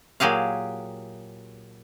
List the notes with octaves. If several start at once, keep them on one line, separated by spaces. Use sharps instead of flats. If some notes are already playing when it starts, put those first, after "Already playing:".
A#2 F#3 G4 G#4 F5